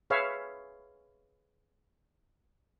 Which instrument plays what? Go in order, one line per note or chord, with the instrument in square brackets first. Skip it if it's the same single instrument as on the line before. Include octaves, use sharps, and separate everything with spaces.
[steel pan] G#4 B4 C#5 E5 F5